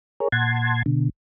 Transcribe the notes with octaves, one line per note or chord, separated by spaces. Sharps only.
G#4 A#4 C#5
A#2 F#5 A5 C6 G#6
B2 D3